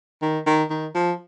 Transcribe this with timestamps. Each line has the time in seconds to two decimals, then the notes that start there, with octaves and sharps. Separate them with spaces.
0.22 D#3
0.46 D#3
0.70 D#3
0.95 F3